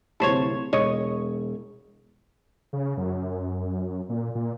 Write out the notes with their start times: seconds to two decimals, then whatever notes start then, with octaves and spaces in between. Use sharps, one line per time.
0.20 D1 C2 A4 C5 C#5
0.73 E1 C#5 D#5 C#6
2.73 C#3
2.97 F#2
4.09 A#2
4.35 A#2